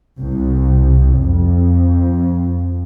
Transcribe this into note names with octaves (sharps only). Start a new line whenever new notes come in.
C2
F2